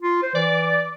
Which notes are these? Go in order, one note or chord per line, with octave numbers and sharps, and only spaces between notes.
F4
C5
E3 D5